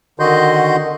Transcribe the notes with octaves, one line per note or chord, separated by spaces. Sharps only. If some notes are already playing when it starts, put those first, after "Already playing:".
D3 D#3 F#4 D#5 C6 G6